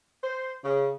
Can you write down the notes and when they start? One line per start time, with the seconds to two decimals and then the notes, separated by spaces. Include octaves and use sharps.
0.23 C5
0.63 C#3